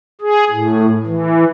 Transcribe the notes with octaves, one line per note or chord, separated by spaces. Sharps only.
G#4
A2
E3